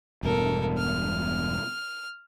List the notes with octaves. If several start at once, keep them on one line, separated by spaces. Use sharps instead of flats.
E1 G2 B2 A4 A#4
F6